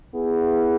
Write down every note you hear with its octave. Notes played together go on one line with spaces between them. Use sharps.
B3 E4 G#4